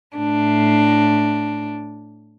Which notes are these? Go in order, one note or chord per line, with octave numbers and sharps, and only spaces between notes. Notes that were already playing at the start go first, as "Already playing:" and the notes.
A2 D4